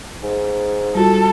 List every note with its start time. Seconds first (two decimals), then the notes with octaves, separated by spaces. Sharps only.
0.23 G#2
0.95 G3 F4 F#4 A4